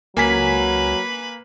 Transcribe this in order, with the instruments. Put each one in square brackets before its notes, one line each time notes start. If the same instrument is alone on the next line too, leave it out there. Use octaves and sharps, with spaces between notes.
[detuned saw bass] C#2 [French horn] F#3 [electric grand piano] A#3 G#5 B6 [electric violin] B4 B5